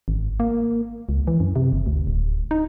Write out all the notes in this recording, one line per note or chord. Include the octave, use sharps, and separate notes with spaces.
G#1
A#3
C#2
E3
F#2
C3
F#1
D2
D1
D#4